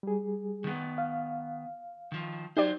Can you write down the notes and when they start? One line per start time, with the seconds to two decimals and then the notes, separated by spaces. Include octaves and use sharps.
0.03 G3 G#4
0.64 D#3 B3
0.98 F5
2.12 D#3 F3
2.57 F#3 D#4 G4 C5 D5